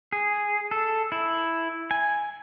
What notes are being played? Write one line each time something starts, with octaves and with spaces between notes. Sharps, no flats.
G#4
A4
E4
G#5